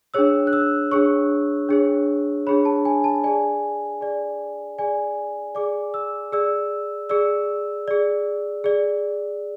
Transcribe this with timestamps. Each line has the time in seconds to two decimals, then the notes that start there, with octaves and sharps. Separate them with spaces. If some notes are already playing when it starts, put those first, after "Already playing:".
0.14 D4 G#4 C#5 E6
0.47 F#6
0.53 E6
0.91 D4 G#4 C#5 C#6
1.69 D4 G#4 C#5
2.47 D4 G#4 C#5 B5
2.65 A5
2.85 G#5
3.04 A5
3.24 G#4 D5 G#5
4.01 G#4 D5
4.78 G#4 D5 G#5
5.55 G#4 D5 D6
5.94 E6
6.32 G#4 D5 E6
7.09 G#4 D5 E6
7.88 G#4 D5
8.64 G#4 D5